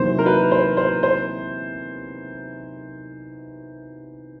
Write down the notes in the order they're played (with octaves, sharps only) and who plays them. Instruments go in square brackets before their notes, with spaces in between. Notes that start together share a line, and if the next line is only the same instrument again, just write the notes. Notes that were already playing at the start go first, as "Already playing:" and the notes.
Already playing: [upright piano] E2 C3 D#3 F#3 A#3 [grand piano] C5
[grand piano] A#4
B4
C5
C5
C5